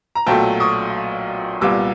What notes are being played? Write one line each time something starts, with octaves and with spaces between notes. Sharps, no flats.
A#5
B1 A#2 F#3 A3 G5 A5
C#6 D#6
C2 A#2 G3 B3 D6 E6